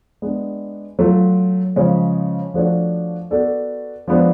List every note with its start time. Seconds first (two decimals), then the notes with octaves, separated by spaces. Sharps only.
0.22 G#3 B3 D4
0.99 F#3 A3 F4
1.76 C#3 F3 G#3 C#4
2.54 F3 A3 D4 F#4 C#5
3.31 B3 F#4 A4 D5
4.08 F3 G#3 B3 D4